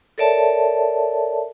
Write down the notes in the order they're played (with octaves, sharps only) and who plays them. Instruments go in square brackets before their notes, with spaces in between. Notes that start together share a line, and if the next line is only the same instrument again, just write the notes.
[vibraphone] A4 A#4 C#5 D5 E5 A5